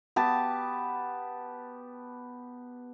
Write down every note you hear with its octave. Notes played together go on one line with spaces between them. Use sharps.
B3 G4 A5